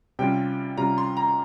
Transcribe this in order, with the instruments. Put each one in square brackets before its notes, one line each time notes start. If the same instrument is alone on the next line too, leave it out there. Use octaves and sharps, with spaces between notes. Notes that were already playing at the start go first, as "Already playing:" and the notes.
[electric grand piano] C3 G3 C#4 F4 [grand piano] G5
[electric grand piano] C3 G3 C#4 F4 [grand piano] A#5
[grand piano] C6
A#5